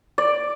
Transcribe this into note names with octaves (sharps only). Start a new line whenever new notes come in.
D5